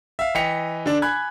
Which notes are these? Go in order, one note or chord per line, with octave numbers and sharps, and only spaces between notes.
E5 F5
E3 D#5 G5 B6 C#7 F7
D3 D4
G#5 B5 F#6 G#6